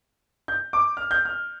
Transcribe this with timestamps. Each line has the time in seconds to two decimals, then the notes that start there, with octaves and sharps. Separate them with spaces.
0.48 G6
0.73 D6
0.97 F6
1.11 G6
1.25 F6